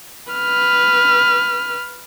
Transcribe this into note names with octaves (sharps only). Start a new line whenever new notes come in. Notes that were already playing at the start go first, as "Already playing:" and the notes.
B4 F6